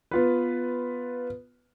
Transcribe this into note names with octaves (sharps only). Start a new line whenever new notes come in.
B3 F4 B4